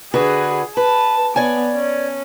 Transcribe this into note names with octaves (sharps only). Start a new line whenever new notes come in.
D3 F#4 G#4 B4
B4 A5
B3 C#5 D5 G#5
C#4